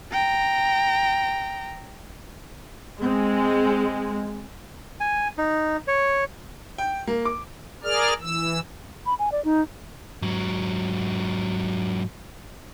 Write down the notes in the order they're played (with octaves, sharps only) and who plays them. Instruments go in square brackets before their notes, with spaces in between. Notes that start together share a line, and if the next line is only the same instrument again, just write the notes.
[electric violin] G5 A#5
[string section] G#3 [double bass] C4
[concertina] G#5
D#4
C#5
[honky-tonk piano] G5
A#3
D6
[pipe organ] G#4 A#4 D5 F6
E3 E6
[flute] B5
G#5
D5
D#4
[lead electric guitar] G#2 F#3